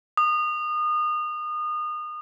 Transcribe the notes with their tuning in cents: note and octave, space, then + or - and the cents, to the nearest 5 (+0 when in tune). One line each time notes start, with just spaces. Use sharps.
D#6 -30